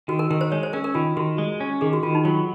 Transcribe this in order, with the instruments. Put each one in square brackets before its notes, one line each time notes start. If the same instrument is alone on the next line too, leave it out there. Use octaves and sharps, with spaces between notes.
[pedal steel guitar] D#3 [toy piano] F#4
[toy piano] A#4
[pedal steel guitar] D#3 [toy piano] A#4
[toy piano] C5
[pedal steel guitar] G#3 [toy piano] C#5
[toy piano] C5
[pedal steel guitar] C#4 [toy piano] A#4
[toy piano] A#4
[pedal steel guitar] D#3 [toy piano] F4
[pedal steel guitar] D#3 [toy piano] F#4
[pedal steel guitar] G#3
C#4
[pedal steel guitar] D#3 [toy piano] G#4
[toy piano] F#4
[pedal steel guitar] D#3 [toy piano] F4
[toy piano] D#4
[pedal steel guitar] F#3 [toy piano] F4